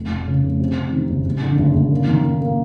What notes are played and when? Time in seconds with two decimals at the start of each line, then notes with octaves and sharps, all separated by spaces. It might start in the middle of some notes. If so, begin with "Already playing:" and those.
Already playing: F1
0.10 F1
0.27 C#3
0.44 F1
0.60 C3
0.76 C3
0.93 D#3
1.09 F#1
1.25 F#1
1.42 D3
1.58 F#1
1.74 F#1
1.91 A#3
2.08 D#3
2.24 A#3
2.41 A#3